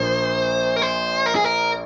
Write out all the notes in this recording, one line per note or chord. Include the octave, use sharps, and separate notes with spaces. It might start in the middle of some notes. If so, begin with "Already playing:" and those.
Already playing: A#1 A#2 F3 C5
A#4
C5
A#4
G#4
A#4